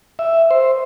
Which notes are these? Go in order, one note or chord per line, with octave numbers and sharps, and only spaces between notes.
E5
C5